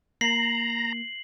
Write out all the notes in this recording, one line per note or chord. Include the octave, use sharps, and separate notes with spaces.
A#3 A#5 C7 F#7